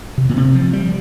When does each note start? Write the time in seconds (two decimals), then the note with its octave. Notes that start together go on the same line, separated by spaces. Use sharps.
0.18 C3
0.29 A#2
0.37 C3
0.55 F3
0.73 G3